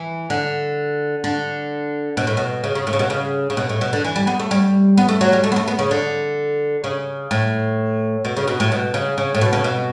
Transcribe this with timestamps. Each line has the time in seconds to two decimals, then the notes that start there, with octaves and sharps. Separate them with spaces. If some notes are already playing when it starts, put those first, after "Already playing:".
Already playing: E3
0.30 D3
1.24 D3
2.17 B2
2.27 A2
2.37 B2
2.64 C#3
2.75 C#3
2.87 A2
2.93 C#3
2.99 B2
3.10 C#3
3.50 C#3
3.57 B2
3.69 A2
3.81 B2
3.93 D3
4.04 E3
4.16 G3
4.27 B3
4.40 A3
4.51 G3
4.98 B3
5.09 A3
5.21 F#3
5.33 G3
5.44 A3
5.52 B3
5.56 A3
5.68 B3
5.79 C#3
5.91 D3
6.84 C#3
7.31 A2
8.25 B2
8.37 C#3
8.48 B2
8.60 A2
8.72 B2
8.94 C#3
9.18 C#3
9.35 A2
9.41 B2
9.53 C#3
9.64 B2